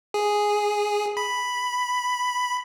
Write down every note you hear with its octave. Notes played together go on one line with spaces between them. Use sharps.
G#4
B5